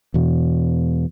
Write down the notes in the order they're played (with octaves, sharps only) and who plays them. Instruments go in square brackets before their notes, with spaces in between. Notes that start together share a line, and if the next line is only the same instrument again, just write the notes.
[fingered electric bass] E2 B2